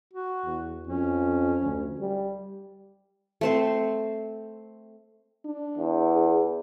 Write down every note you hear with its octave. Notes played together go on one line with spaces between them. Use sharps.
F#4
E2
F2 C#4
D2
G3
A3 C4 C5
D4
E2
G#4